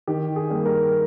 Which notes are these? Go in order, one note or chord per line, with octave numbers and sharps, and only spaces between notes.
D#3 G4
G#4
G3 A#3
A#4